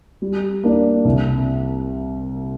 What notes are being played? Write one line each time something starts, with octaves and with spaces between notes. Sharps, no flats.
G3
A#3 D4
C2